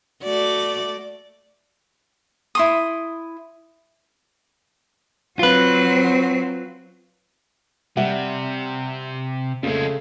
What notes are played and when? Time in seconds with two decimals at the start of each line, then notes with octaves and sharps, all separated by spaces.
0.23 A3 F#4 D5
2.55 E4 C6 D#6
5.39 F#3 C4 F4 B4
7.97 C3 G3 E5 F#5
9.63 F2 C#3 G#3 A3